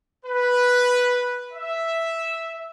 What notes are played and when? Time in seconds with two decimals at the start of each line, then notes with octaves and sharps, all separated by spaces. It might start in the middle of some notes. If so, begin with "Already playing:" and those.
0.25 B4
1.53 E5